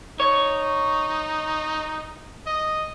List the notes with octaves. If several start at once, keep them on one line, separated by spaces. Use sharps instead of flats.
D#4 C#5
D#5